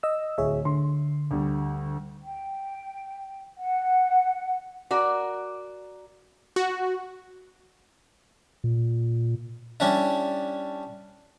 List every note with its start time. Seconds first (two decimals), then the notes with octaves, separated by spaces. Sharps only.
0.03 D#5 E6
0.38 D1 G#4 C#5 E5
0.65 D3 C6
1.31 D2 G3
2.23 G5
3.59 F#5
4.91 F#4 A#4 D5
6.56 F#4
8.64 A#2
9.80 G3 C#4 D4 E4